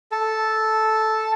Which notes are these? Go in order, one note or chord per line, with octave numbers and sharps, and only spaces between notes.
A4